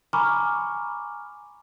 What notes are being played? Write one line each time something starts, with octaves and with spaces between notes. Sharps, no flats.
G#5 A#5 B5 C#6 D6 F6